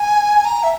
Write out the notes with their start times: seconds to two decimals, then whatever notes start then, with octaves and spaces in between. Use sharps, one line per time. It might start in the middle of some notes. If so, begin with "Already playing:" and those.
Already playing: G#5
0.44 A#5
0.63 E5